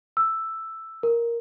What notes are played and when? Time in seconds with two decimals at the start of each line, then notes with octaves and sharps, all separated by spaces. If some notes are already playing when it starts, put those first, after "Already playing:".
0.17 E6
1.03 A#4